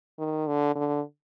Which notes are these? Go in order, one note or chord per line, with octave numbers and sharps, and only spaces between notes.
D#3
D3
D3